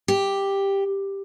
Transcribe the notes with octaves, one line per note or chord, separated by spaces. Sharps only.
G4